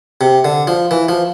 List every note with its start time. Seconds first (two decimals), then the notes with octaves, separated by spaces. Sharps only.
0.21 C3
0.45 D3
0.67 F3
0.91 E3
1.09 F3